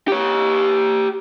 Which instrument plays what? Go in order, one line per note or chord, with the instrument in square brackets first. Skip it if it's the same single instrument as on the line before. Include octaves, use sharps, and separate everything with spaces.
[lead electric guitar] G4 C#5